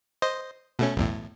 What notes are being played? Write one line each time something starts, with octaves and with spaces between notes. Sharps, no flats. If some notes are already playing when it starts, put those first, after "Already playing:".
C5 D#5
B2 A3 C#4
B1 E2 A2